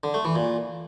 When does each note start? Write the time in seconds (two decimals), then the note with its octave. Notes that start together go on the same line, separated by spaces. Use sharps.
0.04 D3
0.14 A3
0.25 E3
0.35 A#2